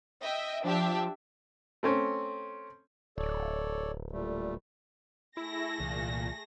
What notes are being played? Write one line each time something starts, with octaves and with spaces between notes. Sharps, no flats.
D#5 E5 G5
F3 D4 G4 E5
A3 C4 C#4
D1 A4 C#5 D5
A#2 G3 A3
A3 E4 G#4 A#6
C2 A#2 E3